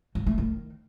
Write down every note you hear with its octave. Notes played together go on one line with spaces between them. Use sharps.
F#3
A3
D#3